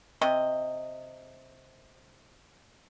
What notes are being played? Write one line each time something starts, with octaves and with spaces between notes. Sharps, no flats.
C3 D#5